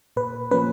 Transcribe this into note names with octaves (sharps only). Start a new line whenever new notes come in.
A#2 B4
F3 A#3 C#4 B4